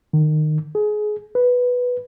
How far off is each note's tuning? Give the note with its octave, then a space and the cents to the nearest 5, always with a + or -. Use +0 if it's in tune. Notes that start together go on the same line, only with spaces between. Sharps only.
D#3 -25
G#4 +25
B4 +0